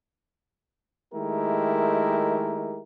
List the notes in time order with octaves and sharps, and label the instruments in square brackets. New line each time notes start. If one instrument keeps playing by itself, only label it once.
[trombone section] D#3 G#3 A3 E4 G4 A#4